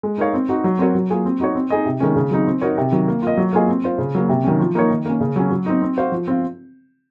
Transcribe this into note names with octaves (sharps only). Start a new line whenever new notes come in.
G#3
D#4 A#4 C#5 F5
C4
D#4 F#4
F#3
C4 F#4 A#4 C#5
F#3
A#3 F4 G#4
C4
D#4 F#4 C#5
C4
D#4 G#4 D#5
C3
D#3 G#3 C#4
C#3
F#3 C4 D#4
C4
D#4 F#4 A#4 C#5
C3
D#3 F#3
A#3
F4 A#4 D#5
F#3
A#3 F4 G#4 D#5
C4
F4 C5
C#3
F#3 A#3
C3
D#3 F#3 C#4
F3
A#3 D#4 A#4 C#5
D#3
A#3 C#4
C#3
F#3 C#4
F#3
C4 D#4
C4
F#4 C5 F5
F3
C4 F4